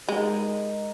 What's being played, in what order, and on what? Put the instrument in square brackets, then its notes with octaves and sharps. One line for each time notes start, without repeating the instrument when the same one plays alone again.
[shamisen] G#3 [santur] D#4 A#4 D#5